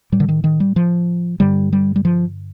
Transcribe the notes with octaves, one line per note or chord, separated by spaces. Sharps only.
A2 G3
D3
D#3
D#3
G3
F3
G2 D3 G3
G3
G3
F3